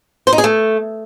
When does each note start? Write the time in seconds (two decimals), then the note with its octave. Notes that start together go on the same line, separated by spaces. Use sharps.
0.27 C5
0.33 D#4
0.38 G#4
0.44 A3